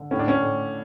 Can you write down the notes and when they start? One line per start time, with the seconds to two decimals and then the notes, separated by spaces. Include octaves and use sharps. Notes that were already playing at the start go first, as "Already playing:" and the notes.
Already playing: D3
0.11 A2 C#4
0.19 D4
0.28 C#4
0.41 A2